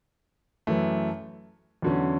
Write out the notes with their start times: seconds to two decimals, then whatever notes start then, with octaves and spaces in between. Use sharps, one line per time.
0.67 F#2 E3 A3
1.82 E2 D3 F#3 C#4